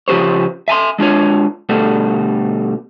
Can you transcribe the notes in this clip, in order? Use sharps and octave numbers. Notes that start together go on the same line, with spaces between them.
C#3 F3 G4 C5 C#5
E5 G#5 A5 C6
G#3 D4 F4 C#5
B2 D3 G3 A3 F#4